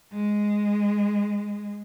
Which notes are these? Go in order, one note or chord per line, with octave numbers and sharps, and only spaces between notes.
G#3